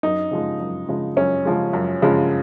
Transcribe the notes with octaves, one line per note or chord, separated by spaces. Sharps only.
F#2 D#4
C#3 F3 G#3
F#2
C#3 F3 G#3
F#2 C#4
C#3 F3 G#3
F#2
C#3 F3 G#3